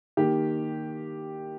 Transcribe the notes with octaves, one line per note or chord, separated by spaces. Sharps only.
D#3 A#3 G4